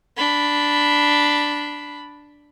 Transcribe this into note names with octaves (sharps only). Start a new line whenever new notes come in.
D4 B5